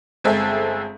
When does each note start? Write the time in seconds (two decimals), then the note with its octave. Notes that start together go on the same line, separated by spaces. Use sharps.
0.24 G1 G#3 C4 G#4 A4 E5